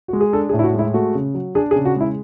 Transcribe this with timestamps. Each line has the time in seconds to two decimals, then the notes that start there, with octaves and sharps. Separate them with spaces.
0.08 G#3 F#4
0.21 G#4
0.33 D4 A4
0.49 G#4
0.53 A2
0.59 E4
0.63 F#4
0.74 G#3
0.79 E4
0.94 A3 F#4
1.15 C#3
1.34 F#3
1.55 D4 G#4
1.71 G#4
1.76 C#3
1.85 F#4
1.96 G#3 E4